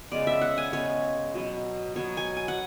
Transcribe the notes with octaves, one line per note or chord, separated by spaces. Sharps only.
C#3 G#3 B3 D5
E5
F#5
G#5
C#3 G#3 B3 C#5
B2 F#3 B3
B2 F#3 B3 C#5
G#5
G#5
F#5